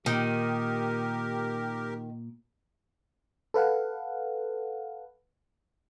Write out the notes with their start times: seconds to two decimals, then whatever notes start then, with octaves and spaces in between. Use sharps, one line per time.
0.06 A#2 D#3 G4 A#4
3.54 A4 B4 F5 F#5